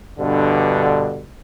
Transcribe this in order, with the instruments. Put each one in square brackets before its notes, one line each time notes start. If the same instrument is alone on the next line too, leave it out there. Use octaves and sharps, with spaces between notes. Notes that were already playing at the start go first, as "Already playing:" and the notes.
[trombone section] G2 B2 D3